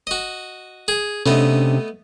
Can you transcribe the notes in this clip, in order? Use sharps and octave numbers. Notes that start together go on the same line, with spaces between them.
F#4 D#5
G#4
C3 A3 B3 C#4 D4 D#5